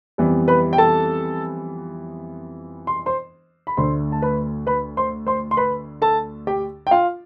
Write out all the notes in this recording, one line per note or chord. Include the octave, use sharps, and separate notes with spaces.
F2 E3 G3 B3
B4 B5
G5
A4 A5
C6
C5 C6
B5
D2 D3 A3 C5 C6
A5
B4 B5
B4 B5
C5 C6
C5 C6
C6
B4 B5
A4 A5
G4 G5
G5
F4 F5